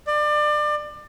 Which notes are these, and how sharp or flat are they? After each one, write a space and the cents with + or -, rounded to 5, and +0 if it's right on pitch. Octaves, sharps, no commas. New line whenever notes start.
D5 +30